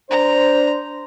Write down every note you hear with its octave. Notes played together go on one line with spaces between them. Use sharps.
D4 C5 A#5